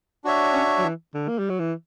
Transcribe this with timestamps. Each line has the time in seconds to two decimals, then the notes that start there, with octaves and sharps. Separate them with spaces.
0.24 D4 F#4 C#5 E5
0.54 C#4
0.78 F#3
0.84 E3
1.14 D3
1.28 A#3
1.39 G3
1.49 F#3
1.59 E3